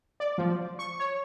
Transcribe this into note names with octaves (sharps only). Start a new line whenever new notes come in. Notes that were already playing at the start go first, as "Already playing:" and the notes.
D5
F3
C#6
C#5